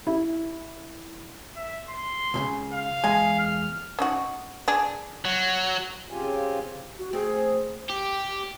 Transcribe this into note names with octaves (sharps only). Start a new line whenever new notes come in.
E4
E5
C6
C#2 A#2 C#3
F5
E2 G#3 G#5
F6
C#4 D#4 F#4
D4 G#4
F#3
C#3 C4 F4 G4 G#5
F#4
A3 C4 G#4
G4